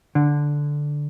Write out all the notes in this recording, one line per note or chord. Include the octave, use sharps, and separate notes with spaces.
D3